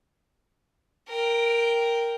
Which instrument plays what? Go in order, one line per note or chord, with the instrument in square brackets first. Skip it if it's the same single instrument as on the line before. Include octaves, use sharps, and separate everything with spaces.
[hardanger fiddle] A#4 G5